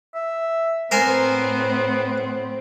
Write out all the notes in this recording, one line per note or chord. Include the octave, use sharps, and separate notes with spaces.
E5
A2 B3 C4 A#4 C5 G#5